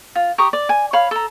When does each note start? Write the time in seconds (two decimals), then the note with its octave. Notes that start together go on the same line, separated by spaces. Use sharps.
0.15 F4
0.38 G4 A#5 C#6 D#6
0.53 D5
0.69 G#5
0.93 C#5 F5 B5
1.11 A4 A#5